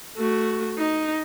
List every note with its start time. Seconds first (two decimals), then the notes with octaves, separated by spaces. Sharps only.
0.17 A3 F#4
0.78 D#4